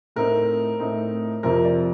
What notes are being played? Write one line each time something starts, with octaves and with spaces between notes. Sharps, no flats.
A2 A3 C4 D#4 A#4
A2 A3 C4 D#4
F2 C3 F3 C4 A#4
D5